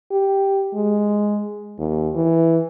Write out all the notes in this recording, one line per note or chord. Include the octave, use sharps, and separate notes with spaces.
G4
G#3
D#2
E3